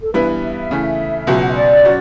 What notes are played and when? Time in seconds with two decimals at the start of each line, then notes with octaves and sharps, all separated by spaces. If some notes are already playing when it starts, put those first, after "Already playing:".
0.02 A4
0.14 G2 E3 G3 B3 E4 B4
0.42 E5
0.71 C#3 E3 A3
1.27 C#2 B2 F#3
1.42 F#5
1.50 E5
1.56 D5
1.85 F#3 C#4 F#4